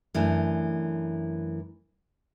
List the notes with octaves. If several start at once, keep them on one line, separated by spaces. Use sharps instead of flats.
F#2 E3 A3 D4